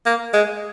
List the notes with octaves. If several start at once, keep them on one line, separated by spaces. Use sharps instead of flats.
A#3
G#3